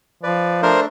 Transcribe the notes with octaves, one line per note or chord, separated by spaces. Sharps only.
F3 B4 D5
A3 D4 A#4 C5